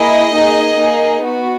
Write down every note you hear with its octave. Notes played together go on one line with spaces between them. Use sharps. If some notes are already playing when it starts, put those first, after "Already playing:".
Already playing: A#3 E4 G#4 D#5
A#3 D#4 G#4
A#3 D#4 G#4
B3 F#4